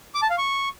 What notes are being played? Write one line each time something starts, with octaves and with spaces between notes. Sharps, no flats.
D6
A5
F5
C#6